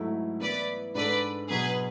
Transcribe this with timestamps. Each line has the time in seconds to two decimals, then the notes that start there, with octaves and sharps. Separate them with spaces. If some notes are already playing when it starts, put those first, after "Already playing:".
Already playing: G#2 F#3 A3 E4
0.41 E3 B3 E4 B4 D5
0.95 G#2 G#3 D4 A4 B4 D5
1.49 B2 F#3 B3 G#4 B4